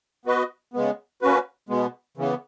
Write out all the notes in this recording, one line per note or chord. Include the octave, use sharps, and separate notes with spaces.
B3 F#4 B4 D#5
C#3 G#3 B3
A#3 C#4 F#4 B4
B2 G#3 B3
C#3 E3 B3